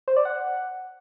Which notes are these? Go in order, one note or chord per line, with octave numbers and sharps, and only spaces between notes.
C5
D5
F#5